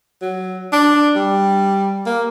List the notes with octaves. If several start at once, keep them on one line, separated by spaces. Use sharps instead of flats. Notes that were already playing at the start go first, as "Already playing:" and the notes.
F#3
D4
G3
A#3